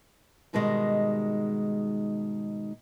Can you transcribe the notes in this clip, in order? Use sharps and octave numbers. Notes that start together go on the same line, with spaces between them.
G#2 B2 D#3 G3 G#3